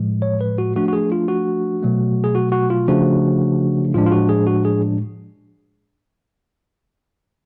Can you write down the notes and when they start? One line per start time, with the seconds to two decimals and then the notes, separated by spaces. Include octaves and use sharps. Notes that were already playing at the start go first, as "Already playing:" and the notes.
Already playing: A2 F3 G#3
0.22 C#5
0.41 B4
0.58 F#4
0.75 F3 A3 D4 F#4
0.88 F#4
0.93 G#4
1.12 F4
1.28 F#4
1.82 B2 F#3 A3
2.24 G#4
2.35 F#4
2.52 F#4
2.70 F4
2.88 C#3 F3 A3 D4 F#4
3.94 A2 F3 G#3 D4 F4
4.06 F4
4.12 F#4
4.29 G#4
4.47 F#4
4.65 G#4